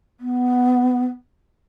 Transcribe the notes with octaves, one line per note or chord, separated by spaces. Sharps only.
B3